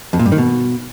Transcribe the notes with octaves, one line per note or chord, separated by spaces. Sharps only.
F2
A#2
G2
D#3
B2